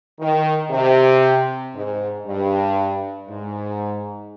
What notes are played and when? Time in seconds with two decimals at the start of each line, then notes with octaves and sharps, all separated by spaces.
0.20 D#3
0.71 C3
1.74 G#2
2.26 G2
3.29 G#2